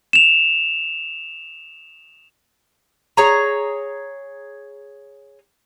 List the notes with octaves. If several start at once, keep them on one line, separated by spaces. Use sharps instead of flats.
E7 F7
G#4 C#5 A#5